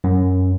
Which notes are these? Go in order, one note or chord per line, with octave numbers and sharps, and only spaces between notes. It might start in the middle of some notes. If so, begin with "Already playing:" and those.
F#2